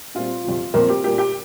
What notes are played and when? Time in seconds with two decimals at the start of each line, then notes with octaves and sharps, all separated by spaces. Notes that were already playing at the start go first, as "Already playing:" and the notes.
0.14 A#2 G3 C4 F4
0.44 F2 C3 F3
0.74 F2 F3 A#3 C4 A#4
0.89 G4
1.04 A#2 G3 A#3 G4
1.18 G4 G5